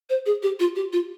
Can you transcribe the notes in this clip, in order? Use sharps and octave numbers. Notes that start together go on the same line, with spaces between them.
C5
G#4
G4
F4
G4
F4